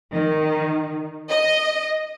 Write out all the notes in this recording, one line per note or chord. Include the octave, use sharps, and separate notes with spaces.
D#3
D#5